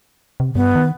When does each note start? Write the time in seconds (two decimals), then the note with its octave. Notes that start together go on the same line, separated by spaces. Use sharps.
0.40 C3
0.55 G2 B3
0.75 D#3